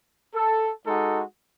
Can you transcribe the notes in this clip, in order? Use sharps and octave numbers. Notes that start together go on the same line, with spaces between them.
A4
G#3 D#4 F#4 A4